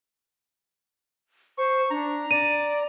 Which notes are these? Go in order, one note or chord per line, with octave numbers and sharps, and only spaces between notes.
C5 C#6
D4 A#5
D5 D#7